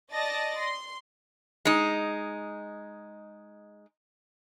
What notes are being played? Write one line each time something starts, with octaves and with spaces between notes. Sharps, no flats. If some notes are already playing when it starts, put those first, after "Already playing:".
D5 D#5 A5 A6 A#6
C6
G#3 D#4